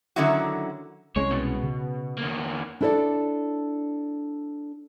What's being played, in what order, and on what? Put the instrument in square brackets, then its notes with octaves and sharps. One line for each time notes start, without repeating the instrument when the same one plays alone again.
[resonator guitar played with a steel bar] D3 D#3 F#3 C#4 E4 F#4
[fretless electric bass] C2 G#3 C#4 [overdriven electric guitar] C#5
[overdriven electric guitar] B2
[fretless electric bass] C#3
[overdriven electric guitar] E2 A#3
[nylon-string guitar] D4 E4 A4 B4 C#5 D5